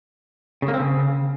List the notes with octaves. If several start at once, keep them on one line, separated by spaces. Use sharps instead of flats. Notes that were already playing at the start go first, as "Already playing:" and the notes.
C#3
A#3
C4
C#3